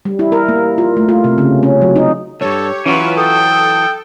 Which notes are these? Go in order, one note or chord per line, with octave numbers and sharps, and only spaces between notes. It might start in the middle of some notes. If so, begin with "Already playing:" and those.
G3
E4
A#4
A#3
F4
A3
F4
C3
C#3
C#4
F#3
D#4
D2 G2 G4 A4 C#5
E3 F#3 C#4 F4 B4 C#6
A4 G5 D#6